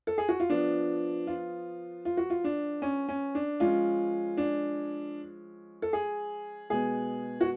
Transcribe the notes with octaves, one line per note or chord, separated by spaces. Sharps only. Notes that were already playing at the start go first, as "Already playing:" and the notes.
A4
G#4
F#4
F4
F3 B3 D4
F4
F4
F#4
F4
D4
C#4
C#4
D4
F3 G#3 C#4 F4
D4
A4
G#4
B2 G#3 B3 G#4
F#4